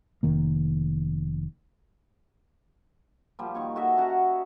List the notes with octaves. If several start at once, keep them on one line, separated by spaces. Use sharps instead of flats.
F1 D#3 A#3
A#2 F3 G3
D#3 D#4 C#5 C#6
F#4 A4 D#5 E5
C#4 F#4 F#5 A#5